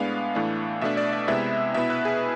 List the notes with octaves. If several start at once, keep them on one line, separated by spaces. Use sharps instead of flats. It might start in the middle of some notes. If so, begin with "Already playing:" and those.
Already playing: A2 G#3 B3 D4 F5
A2 E3 A3 D4
B2 A3 D4 E5
D5
E5
C3 G#3 B3 E4 E5
B2 B3 E4 E5
B4
G#4